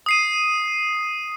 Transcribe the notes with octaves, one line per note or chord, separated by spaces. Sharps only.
D#6 C7 D#7